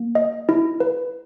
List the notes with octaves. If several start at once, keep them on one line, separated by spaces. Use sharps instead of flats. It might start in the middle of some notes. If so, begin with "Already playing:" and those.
Already playing: A#3
D#5
E4
B4